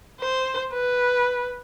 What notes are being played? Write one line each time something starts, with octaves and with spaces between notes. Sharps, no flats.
C5
B4